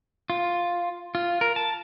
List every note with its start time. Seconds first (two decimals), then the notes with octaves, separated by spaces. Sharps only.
0.30 F4
1.15 F4
1.41 A#4
1.56 A5